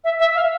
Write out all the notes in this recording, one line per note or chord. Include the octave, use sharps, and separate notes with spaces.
E5
E5
F5